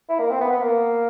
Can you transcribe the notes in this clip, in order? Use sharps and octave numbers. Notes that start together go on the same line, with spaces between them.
E4
A#3
C4
B3
B3
A#3